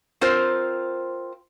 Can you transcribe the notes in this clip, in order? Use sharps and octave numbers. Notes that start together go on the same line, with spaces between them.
C4 F4 A#4 C5